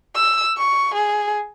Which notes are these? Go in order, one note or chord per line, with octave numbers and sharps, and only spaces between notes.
E6
C#6
G#4